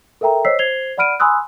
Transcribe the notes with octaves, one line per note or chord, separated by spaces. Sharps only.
A4 A#4 E5 G5 A#5
C5 C#5 D#5 E6 B6 C7
C5 G#6 C7 F7 G7
D5 F#5 B5 F6 D7 D#7
G#5 B5 C6 D#6 E6 F#6